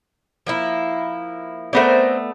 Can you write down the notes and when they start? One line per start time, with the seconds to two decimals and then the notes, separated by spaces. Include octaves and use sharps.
0.47 F3 A#3 E4
1.73 A3 B3 C4 A#4 C5 D5